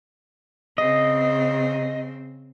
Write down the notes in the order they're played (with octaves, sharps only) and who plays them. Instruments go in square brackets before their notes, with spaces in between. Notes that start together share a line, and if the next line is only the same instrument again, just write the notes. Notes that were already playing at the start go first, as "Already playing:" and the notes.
[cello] C#3 C4 [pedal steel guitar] D#5